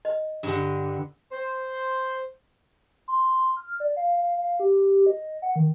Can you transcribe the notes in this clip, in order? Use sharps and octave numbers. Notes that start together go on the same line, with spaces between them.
D#5
G2 D3
C5
C6
F6
D5
F5
F5
F5
G4
D#5
F#5
D#3